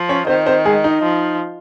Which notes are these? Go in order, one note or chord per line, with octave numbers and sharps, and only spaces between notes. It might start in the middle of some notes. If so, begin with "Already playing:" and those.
Already playing: F3
C#4 C#5
D#3 C4 C5
C4 C5
G#3 G#4
D#4
F3